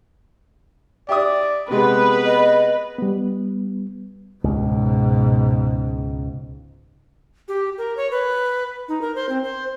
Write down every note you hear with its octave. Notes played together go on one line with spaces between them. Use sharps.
G4 D5 E5 D#6
C3 G#3 B3 B4
D#5
G3 B3
C#2 G#2 B2
G4
A#4
C#5
B4
D#4
A#4
C5
C4
C5